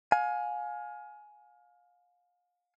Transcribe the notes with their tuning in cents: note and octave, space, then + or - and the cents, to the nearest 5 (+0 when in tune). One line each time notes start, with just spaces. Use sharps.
F5 +30 G#5 +15